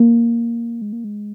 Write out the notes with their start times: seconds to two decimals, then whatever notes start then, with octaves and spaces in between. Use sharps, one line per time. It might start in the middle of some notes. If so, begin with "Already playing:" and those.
Already playing: A#3
0.82 G#3
0.93 A#3
1.04 G#3